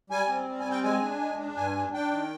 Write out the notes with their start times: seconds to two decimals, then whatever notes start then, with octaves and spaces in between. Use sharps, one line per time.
0.10 G3 G#5
0.28 C4
0.48 G3
0.60 G#5
0.65 C4
0.71 G5
0.83 G#3 G#5
1.02 D4
1.20 G#3
1.38 D4
1.57 G2 G#5
1.76 D4
1.93 D4 G5
2.12 D#3